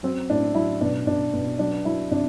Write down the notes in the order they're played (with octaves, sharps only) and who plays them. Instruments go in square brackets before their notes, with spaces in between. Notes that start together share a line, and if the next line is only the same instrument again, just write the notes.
[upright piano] F#3 C4
A2 D4
F#3 E4
B2 D4
B2 D4
B2
F#3 D4
F#3 E4
C3 D4